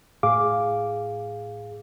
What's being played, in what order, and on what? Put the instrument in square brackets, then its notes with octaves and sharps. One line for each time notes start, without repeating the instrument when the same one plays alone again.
[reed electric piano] A2 G#4 F5 D6